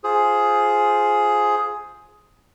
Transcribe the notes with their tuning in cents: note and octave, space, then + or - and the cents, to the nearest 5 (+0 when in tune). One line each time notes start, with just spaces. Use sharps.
F4 +0 G#4 +10 C5 +5